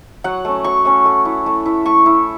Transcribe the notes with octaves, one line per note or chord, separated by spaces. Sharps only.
F#3 F#5
A3 C#4
F#3 C#6
A3 C#4
A3
E4
A3
E4
A3 C#6
E4